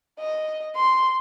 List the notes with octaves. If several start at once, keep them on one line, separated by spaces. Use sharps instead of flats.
D#5
C6